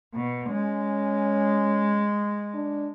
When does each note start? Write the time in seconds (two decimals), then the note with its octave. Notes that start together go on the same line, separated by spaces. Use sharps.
0.13 B2
0.49 G#3 C#4
2.54 D4